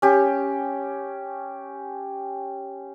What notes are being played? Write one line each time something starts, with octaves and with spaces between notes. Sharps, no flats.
C#4 G4